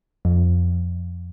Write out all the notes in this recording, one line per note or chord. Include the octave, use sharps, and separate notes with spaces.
F2